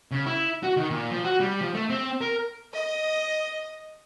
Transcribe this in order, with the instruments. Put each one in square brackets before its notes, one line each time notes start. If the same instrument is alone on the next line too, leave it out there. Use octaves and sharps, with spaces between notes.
[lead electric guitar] C#3
E4
F#4
D#3
A#2
F3
F#4
G3
F3
A3
C4
A#4
[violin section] D#5